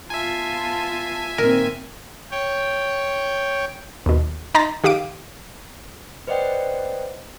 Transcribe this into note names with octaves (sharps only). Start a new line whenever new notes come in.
B3 F4 E5 G#5 A5
A#2 D#3 C4 A#4
C#5 G5
D#2 B2
D#4 A#5 C6 A6 A#6
D#3 G4 F5 D6 D7
B4 C5 D5 D#5 F#5 G5